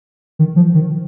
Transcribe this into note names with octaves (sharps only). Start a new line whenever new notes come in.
D#3
F3
D#3